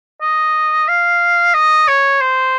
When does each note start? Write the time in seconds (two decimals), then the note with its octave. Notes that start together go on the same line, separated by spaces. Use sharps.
0.22 D#5
0.88 F5
1.54 D#5
1.88 C#5
2.21 C5